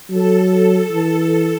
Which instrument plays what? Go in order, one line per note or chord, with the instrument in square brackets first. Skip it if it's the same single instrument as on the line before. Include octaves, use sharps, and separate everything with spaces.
[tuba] F#3 [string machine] A4
[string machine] A4
[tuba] E3